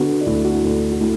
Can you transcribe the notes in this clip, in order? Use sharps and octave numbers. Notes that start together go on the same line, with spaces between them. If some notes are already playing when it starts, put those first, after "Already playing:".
Already playing: D3 B3 F#4
D4
D2 E4
F#4
E4
D2 D4
F#4
A3 E4